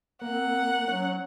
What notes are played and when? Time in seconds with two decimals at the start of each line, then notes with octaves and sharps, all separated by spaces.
0.22 A#3 C4 F#5
0.88 F#3 C#4